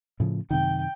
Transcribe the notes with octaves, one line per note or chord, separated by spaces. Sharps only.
A2 C#3 F3
F#2 C3 D#3 G5